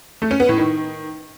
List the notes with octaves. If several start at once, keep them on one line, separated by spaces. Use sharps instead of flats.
A3
C#4
B3
A2
D#3